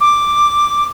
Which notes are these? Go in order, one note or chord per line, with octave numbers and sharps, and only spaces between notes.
D6